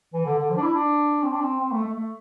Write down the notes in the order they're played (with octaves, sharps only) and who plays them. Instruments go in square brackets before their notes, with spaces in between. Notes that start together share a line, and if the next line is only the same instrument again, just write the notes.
[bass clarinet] E3
D3
D3
F3
D4
E4
D4
C4
D4
C4
C4
A3
A3
A3